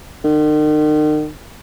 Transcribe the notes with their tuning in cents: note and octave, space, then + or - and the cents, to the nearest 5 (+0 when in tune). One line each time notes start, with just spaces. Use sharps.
D#3 -40